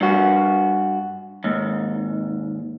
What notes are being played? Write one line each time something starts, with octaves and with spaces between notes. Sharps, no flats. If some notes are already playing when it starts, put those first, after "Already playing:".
G2 F#4
D#2 G#2